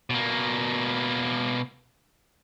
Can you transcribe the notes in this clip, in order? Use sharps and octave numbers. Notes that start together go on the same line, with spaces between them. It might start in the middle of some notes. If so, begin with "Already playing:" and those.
B2 A#3